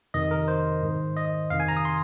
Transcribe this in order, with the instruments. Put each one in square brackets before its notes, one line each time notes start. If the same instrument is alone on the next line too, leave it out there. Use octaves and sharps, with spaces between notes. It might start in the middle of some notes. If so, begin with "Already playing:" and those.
[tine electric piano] F2 C3 D#3 D#5
A#4
C5
G#2 D#3
D#5
F2 C3 D#3 F5
G#5
A#5
D#6
C6